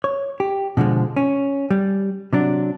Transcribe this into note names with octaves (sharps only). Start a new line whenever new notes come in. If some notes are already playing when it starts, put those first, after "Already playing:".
C#5
G4
B2 D3 F3 G#3
C#4
G3
C3 F#3 D4